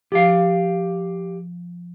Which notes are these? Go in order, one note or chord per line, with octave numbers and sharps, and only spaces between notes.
F3 G4 F5